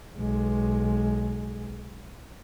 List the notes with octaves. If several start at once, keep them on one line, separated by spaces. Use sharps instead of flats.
B1 G#3